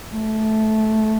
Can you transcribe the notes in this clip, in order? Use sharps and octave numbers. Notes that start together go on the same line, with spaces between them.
A3